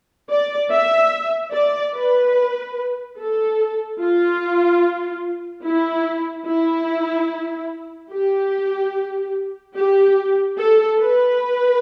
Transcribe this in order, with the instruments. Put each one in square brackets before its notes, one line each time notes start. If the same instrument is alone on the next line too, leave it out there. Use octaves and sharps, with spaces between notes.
[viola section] D5
E5
D5
B4
A4
F4
E4
E4
G4
G4
A4
B4